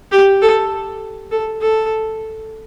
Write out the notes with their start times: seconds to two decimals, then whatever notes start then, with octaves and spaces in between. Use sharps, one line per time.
0.12 G4
0.42 A4
1.31 A4
1.61 A4